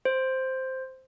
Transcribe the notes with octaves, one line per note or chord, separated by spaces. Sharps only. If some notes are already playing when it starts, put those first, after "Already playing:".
C5